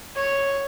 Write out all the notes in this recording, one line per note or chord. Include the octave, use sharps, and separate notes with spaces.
C#5